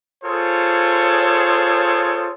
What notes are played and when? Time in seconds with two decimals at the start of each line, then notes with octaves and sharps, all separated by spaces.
0.25 F4 G#4 A4 C5 C#5